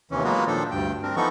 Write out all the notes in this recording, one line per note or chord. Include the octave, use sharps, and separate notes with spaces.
D#2 C3 E3 C#4
F#3 G#3 A#3 B3 F4 F#4
A#2 D#3 F3 D4 A4
D2 G2 G5
C4 D4 A#4
E3 F3 B3 D#4 A4 C#6